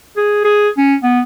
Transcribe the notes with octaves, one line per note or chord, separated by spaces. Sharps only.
G#4
G#4
C#4
B3